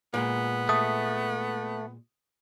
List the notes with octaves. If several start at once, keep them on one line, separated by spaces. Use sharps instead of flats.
A#2 G#3 B3
A3 D#6